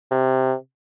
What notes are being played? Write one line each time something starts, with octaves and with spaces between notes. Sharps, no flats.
C3